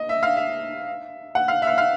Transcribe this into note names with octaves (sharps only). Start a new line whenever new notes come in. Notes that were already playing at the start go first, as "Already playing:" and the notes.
Already playing: D#5
E5
F5
E5
F#5
F5
E5
F5
F5